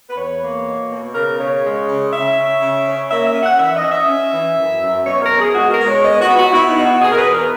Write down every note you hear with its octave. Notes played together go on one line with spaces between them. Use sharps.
B4
E2 C#5
A#3
B2
B2
C#3 A#4
C#3 C#5
G#3
C#3
C#3 E5
C#4
C#3
C#4
A#3 E5
E5
C#4
F#5
E3 E5
D#5
C#4
E5
C#4
E3
F#2
F#2
B2 C#5
A#4
B2
G#4
G#3 F#4
A#4
G#3
C#5
B3 D#5
F#4
B3
F#4
B3 E4
D#4
B2
F#4
B2 G#4
A#4
B4
E2
A#4